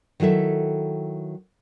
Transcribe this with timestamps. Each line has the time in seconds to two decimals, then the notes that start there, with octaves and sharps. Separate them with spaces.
0.20 D#3 F#3 E4 A4 E5